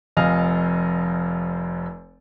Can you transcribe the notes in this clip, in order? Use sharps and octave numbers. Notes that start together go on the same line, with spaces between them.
F1 F2 D#5 F5 G#5 F6